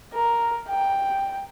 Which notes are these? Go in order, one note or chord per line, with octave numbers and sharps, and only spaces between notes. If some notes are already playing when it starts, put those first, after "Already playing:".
A#4
G5